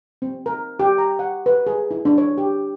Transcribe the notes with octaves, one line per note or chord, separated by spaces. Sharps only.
C4
A#4
G4
A#5
F#5
B4
G#4
E4
D4
C#5
G4